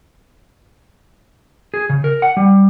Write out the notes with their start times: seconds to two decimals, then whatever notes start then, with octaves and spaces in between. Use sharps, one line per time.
1.74 G#4
1.90 C#3
2.04 A#4
2.22 F#5
2.37 G3